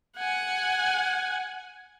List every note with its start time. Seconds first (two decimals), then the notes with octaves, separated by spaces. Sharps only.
0.18 F#5 G#5